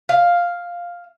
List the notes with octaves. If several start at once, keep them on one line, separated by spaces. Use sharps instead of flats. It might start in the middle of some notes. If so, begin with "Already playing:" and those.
F5